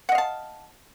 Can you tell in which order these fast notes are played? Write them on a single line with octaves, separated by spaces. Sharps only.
F#5 D#5 F5 A5